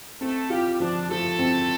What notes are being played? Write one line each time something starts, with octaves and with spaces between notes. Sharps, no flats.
A3 C4 A4
G3 F4 G4
F3 D4
F3 A3 A4
C4